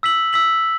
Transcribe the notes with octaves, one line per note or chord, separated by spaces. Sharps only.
E6 B6 F#7
E6 B6 F#7